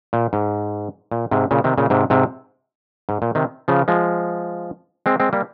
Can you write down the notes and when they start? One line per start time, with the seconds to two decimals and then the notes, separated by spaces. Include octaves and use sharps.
0.13 A#2
0.33 G#2
1.12 A#2
1.31 G#2 C3
1.51 A#2 C#3
1.64 C3 D#3
1.78 A#2 C#3
1.90 G#2 C3
2.10 G#2 C3
3.09 G#2
3.22 A#2
3.35 C3 D#3
3.68 C#3 F3
3.88 F3 G#3
5.06 G#3 C4
5.20 G#3 C4
5.33 G3 A#3